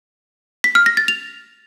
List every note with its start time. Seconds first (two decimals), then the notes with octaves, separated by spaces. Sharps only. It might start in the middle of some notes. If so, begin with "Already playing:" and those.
0.64 B6
0.75 F6
0.86 A#6
0.97 A6
1.08 F7